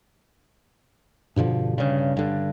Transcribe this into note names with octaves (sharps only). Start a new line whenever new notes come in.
G2 B2 D3 F3
G2 C#3
G2 D3